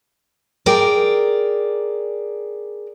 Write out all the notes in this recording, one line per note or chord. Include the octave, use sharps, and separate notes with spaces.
G#4 A#4 D5 G5